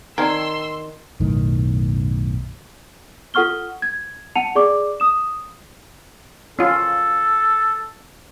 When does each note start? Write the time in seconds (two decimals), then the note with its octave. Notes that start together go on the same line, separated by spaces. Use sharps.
0.18 D#3 C4 D#4 A#4 D5 A5 C6 E6
1.20 B1 F#2 A2 D#3
3.34 F4 A4 F#5 C#6 F6 G7
3.82 G#6
4.35 F#5 A5 C#7 D#7 F7
4.55 G#4 D5 C#6 D6
5.00 D#6 E7
6.59 C#4 F4 A4